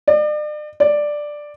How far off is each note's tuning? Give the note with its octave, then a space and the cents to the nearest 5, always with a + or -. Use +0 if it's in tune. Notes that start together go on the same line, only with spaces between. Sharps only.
D5 +40
D5 +5